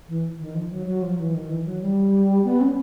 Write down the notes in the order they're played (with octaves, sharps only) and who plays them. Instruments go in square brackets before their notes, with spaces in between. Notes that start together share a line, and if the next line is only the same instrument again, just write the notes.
[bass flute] E3
D#3
F3
F#3
F#3
F3
E3
D#3
E3
F#3
G3
B3
C#4